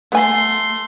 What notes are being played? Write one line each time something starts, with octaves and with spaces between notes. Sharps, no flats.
A3 B3 G#5 C6